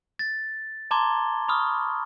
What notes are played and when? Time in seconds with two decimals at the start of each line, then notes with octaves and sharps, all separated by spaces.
0.19 A6
0.91 A5 A#5 C6 D6 G#6 G7
1.49 B5 C#6 D#6 F6